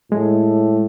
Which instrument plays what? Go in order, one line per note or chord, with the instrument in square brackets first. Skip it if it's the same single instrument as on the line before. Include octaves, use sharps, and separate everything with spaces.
[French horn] A2 [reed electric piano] G#3